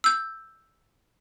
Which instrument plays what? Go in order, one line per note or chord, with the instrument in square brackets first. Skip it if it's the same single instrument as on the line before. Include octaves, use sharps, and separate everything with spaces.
[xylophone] E6 G6